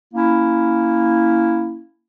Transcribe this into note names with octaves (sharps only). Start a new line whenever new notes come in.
A#3 C#4 E4